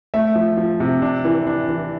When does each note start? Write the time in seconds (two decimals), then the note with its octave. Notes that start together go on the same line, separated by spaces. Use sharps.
0.14 A3 E5
0.35 F3
0.57 F3
0.80 C3
1.02 D4
1.25 E3
1.47 D4
1.69 E3